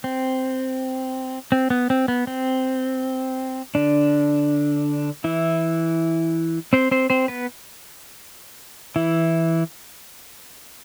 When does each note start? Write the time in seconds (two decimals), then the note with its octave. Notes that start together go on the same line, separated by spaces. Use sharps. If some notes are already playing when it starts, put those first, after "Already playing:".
0.04 C4
1.52 C4
1.70 B3
1.90 C4
2.08 B3
2.27 C4
3.75 D3 D4
5.24 E3 E4
6.73 C4 C5
6.91 C4 C5
7.10 C4 C5
7.28 B3 B4
8.96 E3 E4